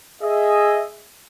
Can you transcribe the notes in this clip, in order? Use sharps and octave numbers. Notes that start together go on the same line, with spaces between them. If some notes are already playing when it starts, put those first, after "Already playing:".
G#4 D#5 E5